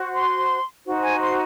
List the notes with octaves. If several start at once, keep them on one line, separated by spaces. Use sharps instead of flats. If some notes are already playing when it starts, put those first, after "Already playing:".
Already playing: F#4 C5
C6
D#4 F#4 C5
G#5
C6